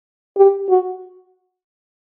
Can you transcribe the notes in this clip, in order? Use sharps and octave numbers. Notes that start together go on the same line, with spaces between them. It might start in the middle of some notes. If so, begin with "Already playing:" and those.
G4
F#4